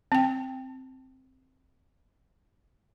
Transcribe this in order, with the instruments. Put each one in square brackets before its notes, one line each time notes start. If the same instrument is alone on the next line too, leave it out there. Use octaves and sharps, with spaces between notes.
[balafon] C4 G5